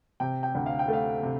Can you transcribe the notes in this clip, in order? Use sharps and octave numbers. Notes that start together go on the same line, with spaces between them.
C3 G5
G5
D2
F5
G5
A3
F5
C3